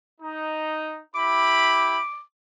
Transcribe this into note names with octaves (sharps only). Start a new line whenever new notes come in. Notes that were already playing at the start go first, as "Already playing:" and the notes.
D#4
E4 G4 B5 D6